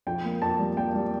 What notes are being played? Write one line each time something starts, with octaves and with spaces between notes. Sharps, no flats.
F2 G5
A#3
F2 A5
G3
A#3 G5
G3